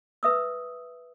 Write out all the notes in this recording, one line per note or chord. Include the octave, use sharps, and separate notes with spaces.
B4 E5 D#6 E6